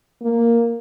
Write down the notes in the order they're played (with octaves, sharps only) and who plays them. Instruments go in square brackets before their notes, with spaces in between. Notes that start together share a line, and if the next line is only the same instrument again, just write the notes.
[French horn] A#3